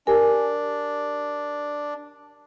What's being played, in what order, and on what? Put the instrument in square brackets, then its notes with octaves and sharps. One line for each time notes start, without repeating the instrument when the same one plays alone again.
[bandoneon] D4 [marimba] G4 A#4 G#5